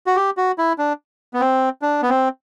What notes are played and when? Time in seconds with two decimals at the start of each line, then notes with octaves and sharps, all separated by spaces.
0.07 F#4
0.16 G4
0.37 F#4
0.58 E4
0.78 D4
1.34 B3
1.40 C4
1.82 D4
2.02 B3
2.09 C4